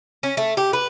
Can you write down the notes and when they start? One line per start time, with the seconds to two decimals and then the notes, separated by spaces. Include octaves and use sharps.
0.23 C#4
0.37 A3
0.57 G4
0.73 B4